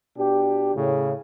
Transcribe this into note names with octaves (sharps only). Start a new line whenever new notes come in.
B2 D4 G4
A2 C#3